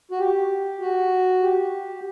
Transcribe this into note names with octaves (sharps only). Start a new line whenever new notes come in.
F#4
G4
F#4
G4